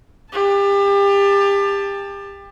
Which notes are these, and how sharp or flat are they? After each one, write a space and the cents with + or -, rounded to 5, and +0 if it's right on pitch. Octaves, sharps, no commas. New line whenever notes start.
G4 +30 A5 +0